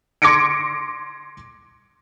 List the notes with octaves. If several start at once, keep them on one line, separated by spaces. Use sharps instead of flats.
C6 D6 G#6 A#6 C#7 D7